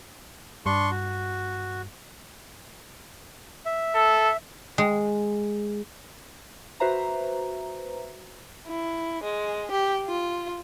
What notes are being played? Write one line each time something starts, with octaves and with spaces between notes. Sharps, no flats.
G2 D4 C6 C#6
F#4
E5
A4
G#3
F#4 B4 C5 E5 A#5
E4
G#3
G4
F4